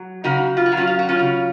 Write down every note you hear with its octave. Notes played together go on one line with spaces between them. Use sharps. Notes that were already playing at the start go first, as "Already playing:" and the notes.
Already playing: F#3
C#3 D#4 F#4
F4
F#4
F#3
C#4 F4
F4
F#4
C#4 F4
C#3